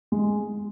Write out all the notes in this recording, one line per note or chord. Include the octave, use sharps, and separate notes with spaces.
G#3